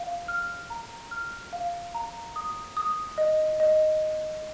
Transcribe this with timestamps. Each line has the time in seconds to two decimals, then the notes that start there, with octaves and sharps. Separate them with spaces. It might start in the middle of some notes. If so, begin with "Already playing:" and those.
Already playing: F5
0.28 F6
0.70 A#5
1.11 F6
1.53 F5
1.94 A#5
2.36 D#6
2.77 D#6
3.18 D#5
3.60 D#5